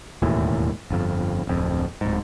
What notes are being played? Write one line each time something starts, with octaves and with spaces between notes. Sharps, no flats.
E1 D#2 A2 E3
G1 F2
D1 F2
D1 G#2